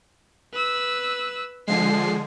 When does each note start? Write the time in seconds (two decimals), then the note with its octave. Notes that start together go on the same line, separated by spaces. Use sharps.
0.53 B4 E6
1.68 D3 F3 G#3 C7